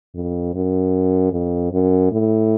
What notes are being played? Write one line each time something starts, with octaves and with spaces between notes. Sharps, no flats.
F2
F#2
F2
F#2
A2